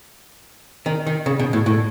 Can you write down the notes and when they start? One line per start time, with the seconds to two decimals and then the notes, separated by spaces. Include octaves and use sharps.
0.86 D#3
1.07 D#3
1.26 C#3
1.39 B2
1.53 A2
1.66 A2